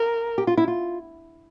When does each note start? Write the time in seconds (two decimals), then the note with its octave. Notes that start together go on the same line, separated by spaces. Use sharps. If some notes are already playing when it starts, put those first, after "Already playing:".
Already playing: A#4
0.38 G4
0.47 F4
0.57 E4
0.68 F4